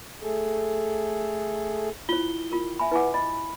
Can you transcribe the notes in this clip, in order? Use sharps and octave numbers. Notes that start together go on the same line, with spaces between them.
A3 G#4 A4
E4 F4 C5 G7
F4 A#4
E5 G#5 B5
E4 B4 F#5 G#5 D6
D#5 B5